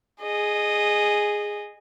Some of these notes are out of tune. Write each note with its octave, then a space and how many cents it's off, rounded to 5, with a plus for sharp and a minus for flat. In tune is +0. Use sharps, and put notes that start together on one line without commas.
G#4 +0 D#5 -15